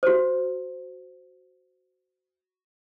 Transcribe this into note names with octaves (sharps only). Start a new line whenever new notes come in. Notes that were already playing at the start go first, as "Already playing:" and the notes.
F#4 C5